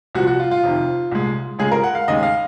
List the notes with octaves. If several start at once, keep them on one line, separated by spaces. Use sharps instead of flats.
C2 A#2 F3 F#4
F#4
F4
F4
F2 C3 D#3
C2 A#2 G#3
C#2 C#3 G#3 G#4
A#4
F#5
F5
D#2 C#3 G#3 D#5
F5